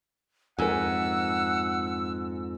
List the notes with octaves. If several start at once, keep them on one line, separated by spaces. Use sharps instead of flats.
F2 G#2 A#4 F#5 G#5 E6